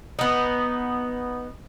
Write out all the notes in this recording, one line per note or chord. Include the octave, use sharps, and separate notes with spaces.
B3 D#4